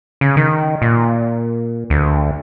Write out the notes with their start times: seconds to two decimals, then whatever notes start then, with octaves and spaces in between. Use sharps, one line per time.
0.21 C#3
0.37 D#3
0.82 A#2
1.90 D2